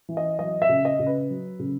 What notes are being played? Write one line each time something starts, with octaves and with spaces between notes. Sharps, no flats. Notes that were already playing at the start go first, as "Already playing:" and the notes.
E3
D#5
F#3 D#5
E5
C#3
D#5
C#3
B4
F#3
C#3